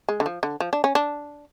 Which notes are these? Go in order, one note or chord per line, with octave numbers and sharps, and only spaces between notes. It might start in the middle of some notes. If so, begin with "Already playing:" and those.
G#3
D3
F3
D3
F3
D4
C#4
D4